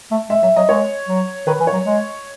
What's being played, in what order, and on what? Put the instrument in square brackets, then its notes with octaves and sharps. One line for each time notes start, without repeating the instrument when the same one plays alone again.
[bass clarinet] A3
[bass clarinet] G#3 [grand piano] E5
[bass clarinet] F#3 [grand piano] E5
[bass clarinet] F#3 [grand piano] D#5
[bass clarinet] G#3 [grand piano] C#5
[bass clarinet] F#3
[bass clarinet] D#3 [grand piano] B4
[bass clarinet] E3
[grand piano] C#5
[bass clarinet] F#3
G#3